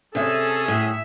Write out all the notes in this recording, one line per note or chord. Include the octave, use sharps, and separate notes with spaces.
C3 C#4 G#4 A4 E5
A2 E5